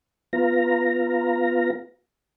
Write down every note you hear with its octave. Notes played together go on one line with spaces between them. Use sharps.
B3 F4 A#5